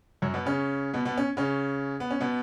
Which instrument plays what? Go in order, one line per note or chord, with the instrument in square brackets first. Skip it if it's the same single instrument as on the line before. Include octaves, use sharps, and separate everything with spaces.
[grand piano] F#2 F#3
B2 B3
C#3 C#4
B2 B3
B2 B3
C#4
C#3 C#4
B3
C#4
B2 B3